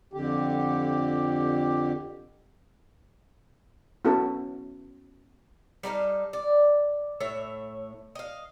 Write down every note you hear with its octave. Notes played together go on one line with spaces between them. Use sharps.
F2 D3 G4
B3 C#4 E4 F#4 A4
G3 D#4 A4 F5
D5
A2 A3 C#5 E5
D#5 F5